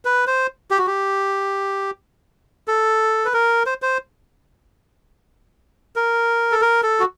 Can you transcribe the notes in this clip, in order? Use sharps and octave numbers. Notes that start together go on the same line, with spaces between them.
B4
C5
G4
F#4
G4
A4
B4
A#4
C5
C5
A#4
A4
A#4
A4
F#4